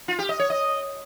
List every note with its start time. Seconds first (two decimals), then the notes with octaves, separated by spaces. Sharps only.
0.08 F4
0.19 G4
0.29 D#5
0.39 C#5
0.50 D#5